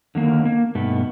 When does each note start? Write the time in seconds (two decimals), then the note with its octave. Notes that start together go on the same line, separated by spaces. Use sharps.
0.15 D3 D#3 A#3
0.45 A#3
0.75 G2 B2 A3 B3 D#4